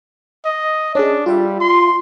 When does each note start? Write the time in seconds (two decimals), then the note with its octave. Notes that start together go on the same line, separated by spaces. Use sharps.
0.45 D#5
0.95 C#4 D4 G#4
1.26 G3 F4 D5 E5
1.60 C6